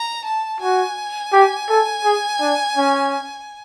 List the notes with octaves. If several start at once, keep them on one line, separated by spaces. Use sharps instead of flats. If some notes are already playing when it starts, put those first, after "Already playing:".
Already playing: A#5
A5
F#4 G#5
G4
A4
G#4
D4
C#4